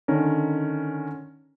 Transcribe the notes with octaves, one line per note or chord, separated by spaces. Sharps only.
D3 D#3 C#4 A#4